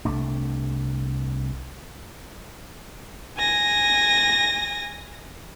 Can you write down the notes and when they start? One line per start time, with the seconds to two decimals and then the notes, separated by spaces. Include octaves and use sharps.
0.05 C2 C3 A3 D4
3.38 G#5 A#6